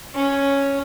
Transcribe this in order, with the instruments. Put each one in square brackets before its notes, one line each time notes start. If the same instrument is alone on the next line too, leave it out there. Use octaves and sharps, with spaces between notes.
[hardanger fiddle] C#4